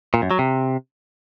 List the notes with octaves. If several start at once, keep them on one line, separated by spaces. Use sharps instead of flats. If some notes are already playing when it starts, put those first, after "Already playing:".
A#2
F#2
F#3
C3